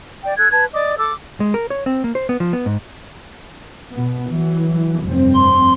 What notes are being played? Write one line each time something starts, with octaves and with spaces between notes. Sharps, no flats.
D5 G5
A4 F#6 G#6
B4 A5 G#6
D5 D#5 D6
A4 D6 E6
G#3
A#4
C#5
C4
A#3
C5
B3
F3
B3
G#2
B2 B3
E3 F#3
F1 G2 C4
C6